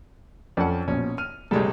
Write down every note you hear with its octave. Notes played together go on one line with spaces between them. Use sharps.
F2 C#4 A4 D5 F#5
A#1 B2 C#4
F6 D#7
A#1 C3 G3 G#3 A4